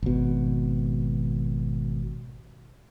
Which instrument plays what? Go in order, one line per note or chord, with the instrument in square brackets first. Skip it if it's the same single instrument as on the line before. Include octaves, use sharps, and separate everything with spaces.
[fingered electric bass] G#1 B2